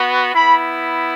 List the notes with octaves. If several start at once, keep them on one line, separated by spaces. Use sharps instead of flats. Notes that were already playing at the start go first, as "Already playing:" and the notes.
Already playing: B3 F#4
B3 E4 B5